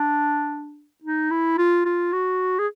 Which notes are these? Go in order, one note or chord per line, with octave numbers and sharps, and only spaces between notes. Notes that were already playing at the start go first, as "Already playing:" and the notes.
Already playing: D4
D#4
E4
F4
F4
F#4
G#4